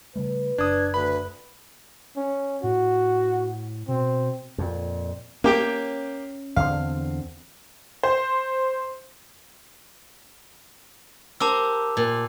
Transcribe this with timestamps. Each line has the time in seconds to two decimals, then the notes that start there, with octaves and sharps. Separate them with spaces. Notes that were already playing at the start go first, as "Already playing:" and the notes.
0.16 C#3 G3 A3 B4
0.58 F#1 D4 D#6 G#6
0.94 D2 B4 B5
2.17 C#4
2.63 A2 F#4
3.88 B2 C4
4.58 F2 A#2
5.44 A#3 C#4 G4 G5
6.56 E2 D3 C4 F5
8.03 C5
11.40 G4 A#4 C5 A5 D6 E6
11.97 A#2